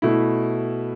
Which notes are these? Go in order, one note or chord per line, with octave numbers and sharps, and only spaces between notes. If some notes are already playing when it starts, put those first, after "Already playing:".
B2 A3 E4